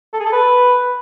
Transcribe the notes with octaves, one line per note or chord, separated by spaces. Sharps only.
A4
G#4
A4
B4